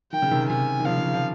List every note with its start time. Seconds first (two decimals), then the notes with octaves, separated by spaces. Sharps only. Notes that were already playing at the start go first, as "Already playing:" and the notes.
0.12 D#3 G5
0.22 C#3
0.31 C3 D#3
0.49 C3 D#3 G#5
0.80 D#3
0.86 C#3 F3 F5
0.97 C#3
1.06 D#3
1.14 F3